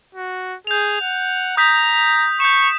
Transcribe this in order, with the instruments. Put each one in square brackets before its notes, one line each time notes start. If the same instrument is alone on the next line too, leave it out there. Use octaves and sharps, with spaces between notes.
[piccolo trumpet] F#4
[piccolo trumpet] G#4 [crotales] G6 F7
[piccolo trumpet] F#5
[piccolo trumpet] A#5 [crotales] D#6 G6 B6
[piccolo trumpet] C#6 [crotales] G6 E7